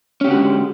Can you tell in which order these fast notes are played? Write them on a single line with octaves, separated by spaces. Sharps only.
C#4 G4 D3 F#4 G#3